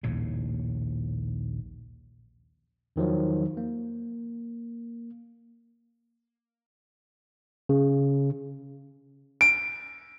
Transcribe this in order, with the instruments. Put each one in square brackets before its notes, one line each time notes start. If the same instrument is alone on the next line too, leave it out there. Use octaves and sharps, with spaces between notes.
[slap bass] A#1 D#2 A2 C#3
[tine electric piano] E2 D#3 F3 F#3
A#3
C#3
[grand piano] D7